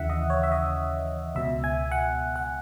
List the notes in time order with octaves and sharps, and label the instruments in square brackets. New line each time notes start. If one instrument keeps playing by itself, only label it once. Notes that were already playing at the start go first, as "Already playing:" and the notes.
Already playing: [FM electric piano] D#2 C#3 E3 E5 F#5
D#5
C#5
E5
D#5
C#2 B2 E5
G#5
F#5
F#5